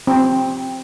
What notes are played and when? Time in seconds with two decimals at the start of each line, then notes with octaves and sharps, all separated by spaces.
0.07 C4